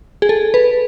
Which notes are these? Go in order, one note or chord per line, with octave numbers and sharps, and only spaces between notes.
G#4
A4
B4